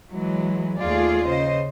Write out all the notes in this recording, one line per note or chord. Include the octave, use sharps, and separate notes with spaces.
E3 F#3 G#3
D#2 A3 F4 G#4 D5
C#3 C5 D#5